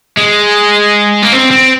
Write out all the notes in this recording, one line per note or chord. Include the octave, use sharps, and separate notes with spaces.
G#3
A#3
C4
C4